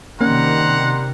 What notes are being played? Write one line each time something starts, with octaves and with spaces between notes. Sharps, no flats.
C3 D#3 G3 A#3 C#4 F#5 A#5 C6